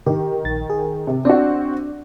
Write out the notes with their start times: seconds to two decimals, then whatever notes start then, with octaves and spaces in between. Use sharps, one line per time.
0.06 D#3 G4
0.44 A#1 A6
0.70 G#4
1.07 C3
1.25 C4 D4 F#4 D5